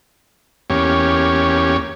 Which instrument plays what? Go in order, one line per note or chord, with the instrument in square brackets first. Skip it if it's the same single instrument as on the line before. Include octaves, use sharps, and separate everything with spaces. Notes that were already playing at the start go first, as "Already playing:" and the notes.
[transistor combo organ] E2 A#3 C#4 G4 C#5